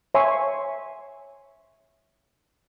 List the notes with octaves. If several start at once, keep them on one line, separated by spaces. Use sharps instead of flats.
C#5 E5 G#5 C6 C#6